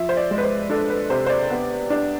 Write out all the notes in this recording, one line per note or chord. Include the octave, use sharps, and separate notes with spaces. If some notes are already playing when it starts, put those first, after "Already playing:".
Already playing: F3 E5
C5
D5
G#3
B4
C5
D4 A4
B4
C3 C5
C5
D5
B3
D4